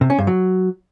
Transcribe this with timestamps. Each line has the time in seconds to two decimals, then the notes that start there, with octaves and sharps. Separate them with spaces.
0.01 C3
0.10 C#4
0.18 G2
0.27 F#3